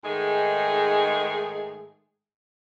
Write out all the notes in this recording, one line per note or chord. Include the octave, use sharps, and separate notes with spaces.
G#2 D#3 G#3 A3 G#4